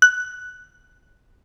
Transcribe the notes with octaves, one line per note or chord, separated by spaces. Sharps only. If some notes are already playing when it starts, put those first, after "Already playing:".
F#6